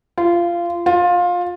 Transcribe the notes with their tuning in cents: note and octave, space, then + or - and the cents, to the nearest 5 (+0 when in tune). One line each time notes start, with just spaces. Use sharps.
F4 -20
F4 +20